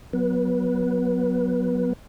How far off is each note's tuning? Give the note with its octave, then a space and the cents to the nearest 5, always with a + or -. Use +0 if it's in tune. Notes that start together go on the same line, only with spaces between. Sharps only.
F#3 -15 B3 +0 B4 -20